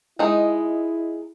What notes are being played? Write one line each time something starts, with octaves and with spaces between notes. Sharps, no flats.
G#3 D#4 E4